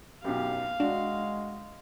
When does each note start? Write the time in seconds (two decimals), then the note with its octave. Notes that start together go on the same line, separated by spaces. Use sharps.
0.24 B1 F#2 G4 F5
0.80 G#3 D4 F#4